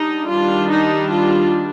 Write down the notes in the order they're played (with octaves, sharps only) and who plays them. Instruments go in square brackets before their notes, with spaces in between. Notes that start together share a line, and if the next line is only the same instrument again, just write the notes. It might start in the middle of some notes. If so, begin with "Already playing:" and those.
Already playing: [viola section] G3 D4 D#4
D#3 G3 D4 F4
D#4
F4